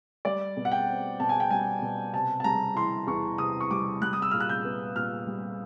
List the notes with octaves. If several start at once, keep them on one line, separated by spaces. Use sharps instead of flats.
G3 D5
B2
F#5
G5
C4
B2 A5
G#5
G5
G3 G#5
B2
C3 A5
A5
G3 A#5
E3 C6
E2 C#6
C3 D#6
C#6
G3 D6
G3 F#6
D#6
E6
A#2 F6
F#6
G6
B3
A#2 F6
G3